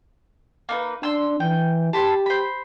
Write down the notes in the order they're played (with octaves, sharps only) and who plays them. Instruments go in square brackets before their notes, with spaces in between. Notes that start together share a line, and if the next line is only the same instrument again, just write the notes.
[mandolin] A#3 D#4 B4
[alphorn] D4 [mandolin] C6 E6
[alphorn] E3 [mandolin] G5
[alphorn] G4 [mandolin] A5 B5 C6
[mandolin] C5 B5